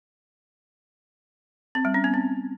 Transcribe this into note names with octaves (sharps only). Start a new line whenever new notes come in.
C4
G3
C#4
B3
C4